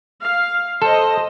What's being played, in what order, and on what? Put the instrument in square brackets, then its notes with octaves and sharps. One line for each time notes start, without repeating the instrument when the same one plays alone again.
[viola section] F5
[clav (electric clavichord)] A4 [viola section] C5 D#5